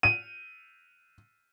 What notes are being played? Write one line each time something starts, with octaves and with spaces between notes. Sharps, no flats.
D#7